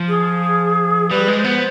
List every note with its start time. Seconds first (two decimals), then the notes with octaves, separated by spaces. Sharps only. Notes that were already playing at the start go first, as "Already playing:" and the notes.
Already playing: F3
0.08 G#4
1.10 G3 B4
1.28 G#3
1.36 C5
1.44 B3